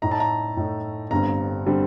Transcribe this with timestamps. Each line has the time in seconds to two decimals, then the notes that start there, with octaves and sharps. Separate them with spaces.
0.02 A2 A3 D#4 A#5
0.11 A5
0.20 A#5
0.57 A2 A3 D#4
1.11 G1 G2 D3 G3 C4 A#5
1.66 D3 G3 C4